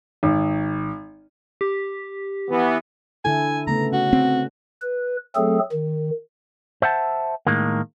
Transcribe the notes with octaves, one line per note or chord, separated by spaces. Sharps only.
G#1
G4
E3 B3
D3 E4 A4 G#5
C#3 A3 B3 A#5
C#4 F#4
C4
B4
F#3 A3 C4 G#4 A4
D#3
C5 E5 F#5 A5
A2 D#3 G#3 A#3